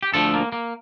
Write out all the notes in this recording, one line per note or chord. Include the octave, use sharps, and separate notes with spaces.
G4
D2 D3 F3 A3 A4
A#3
A#3